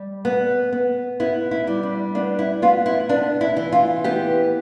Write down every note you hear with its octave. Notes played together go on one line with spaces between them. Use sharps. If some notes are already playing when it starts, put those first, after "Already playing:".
Already playing: G3
B3
B3
B3 E4
E4
G3
D4
B3 D4
E4
B3 F4
E4
B3 D4
E4
E3
F4
B3 G4